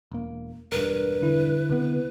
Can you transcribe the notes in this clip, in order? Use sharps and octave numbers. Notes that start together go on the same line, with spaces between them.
E1 A#3
E1 G2 A#4 B4
D3 E4
C#2 C3 B3